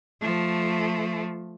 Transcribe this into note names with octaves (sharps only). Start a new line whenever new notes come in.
F3 A3